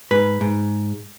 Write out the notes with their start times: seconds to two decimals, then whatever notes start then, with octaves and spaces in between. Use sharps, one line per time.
0.11 G#2 B4
0.41 G#2